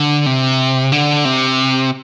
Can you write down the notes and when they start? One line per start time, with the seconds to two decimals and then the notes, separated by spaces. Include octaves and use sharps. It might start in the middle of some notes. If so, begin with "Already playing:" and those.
Already playing: D3
0.26 C3
0.92 D3
1.25 C3